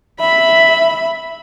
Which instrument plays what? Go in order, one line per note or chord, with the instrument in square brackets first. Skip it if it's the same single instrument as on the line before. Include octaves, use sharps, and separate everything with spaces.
[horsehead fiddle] E5 [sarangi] B5